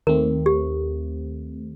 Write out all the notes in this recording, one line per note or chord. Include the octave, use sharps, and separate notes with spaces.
D#2 D#3 A3 C4 A#4
G4